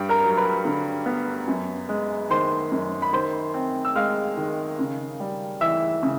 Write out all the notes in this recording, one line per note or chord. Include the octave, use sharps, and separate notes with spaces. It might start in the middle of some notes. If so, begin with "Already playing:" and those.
Already playing: G2 G4 G5
A#4 A#5
F#3
B4 B5
D3
B3
F#2
G#3
D#3 C5 C6
F#2
B5
D#3 C5 C6
C4
E6
G#3 F5 F6
D#3
C#3
G3
E3 E5 E6
C#3